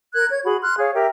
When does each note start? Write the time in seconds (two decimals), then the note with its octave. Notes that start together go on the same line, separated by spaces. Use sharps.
0.14 A#4 F#6 G#6
0.30 C#5 G#6
0.45 F#4 G#4 B5
0.62 C6 F6 F#6
0.79 G#4 C#5 F5
0.94 G4 A#4 E5 G5